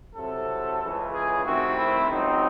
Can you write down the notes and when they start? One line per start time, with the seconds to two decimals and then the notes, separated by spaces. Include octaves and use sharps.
0.15 C2 C3 F#3 A4
0.81 C#2 C#3 E3
1.13 G#4
1.44 C2 C3 D#3 A3 C4 F#4
1.77 E4
2.09 C#2 C#3 F#3 C4 D#4